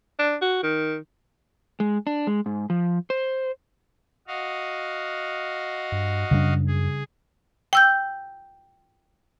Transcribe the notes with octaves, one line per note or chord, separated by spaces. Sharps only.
D4
F#4
D#3
G#3
D4
G#3
G#2
F3
C5
F#4 D#5 F5
G2
F#2 C#3 G3 D4
G#4
G5 E6 G6